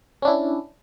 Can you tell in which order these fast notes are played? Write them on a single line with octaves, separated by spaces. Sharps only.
C#4 D4 E4